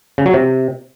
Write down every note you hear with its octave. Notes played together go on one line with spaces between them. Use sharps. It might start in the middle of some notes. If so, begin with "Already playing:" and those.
C#3
F#3
C3